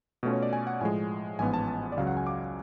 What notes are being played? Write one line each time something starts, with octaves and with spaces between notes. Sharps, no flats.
B2 A3 C#4 F4
C#5
D5
G#5
F#5
A2 F3 G#3 G#5
A1 G#2 F3 B3 F4 G#5
A5
A5
D5
C#2 C#3 F#3 F5
F#5
G#5
D6